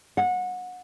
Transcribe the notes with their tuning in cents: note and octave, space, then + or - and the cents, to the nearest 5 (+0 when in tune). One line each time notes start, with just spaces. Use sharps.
F#5 -25